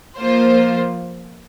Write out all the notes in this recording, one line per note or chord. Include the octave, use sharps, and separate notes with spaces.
F3 A#3 F4 C5